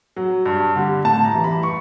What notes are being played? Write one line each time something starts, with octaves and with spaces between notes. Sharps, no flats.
F#3
G2
D3 G3
A2 A5
A#5
E3 G3
B5
C#6